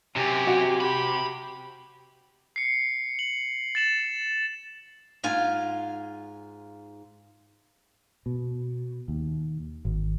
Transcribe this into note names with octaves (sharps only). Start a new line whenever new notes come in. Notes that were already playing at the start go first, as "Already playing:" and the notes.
F#2 C3 G4 G#5
F#4
G4 B5
C7 C#7
F#7
A6 E7 F#7
G#2 F4 G#5
B2
D#2
G#1